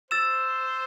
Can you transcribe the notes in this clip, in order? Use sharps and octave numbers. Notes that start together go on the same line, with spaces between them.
C5 E6 A6 E7